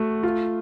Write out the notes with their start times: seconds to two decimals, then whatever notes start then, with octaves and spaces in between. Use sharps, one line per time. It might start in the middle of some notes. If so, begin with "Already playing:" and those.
Already playing: A3 F#4
0.23 F4